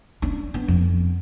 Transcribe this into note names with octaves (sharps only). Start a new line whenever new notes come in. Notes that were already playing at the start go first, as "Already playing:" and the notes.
C#4 D4
B3 D4
F2